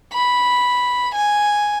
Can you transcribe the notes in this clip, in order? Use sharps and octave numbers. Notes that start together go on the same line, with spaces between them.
B5
G#5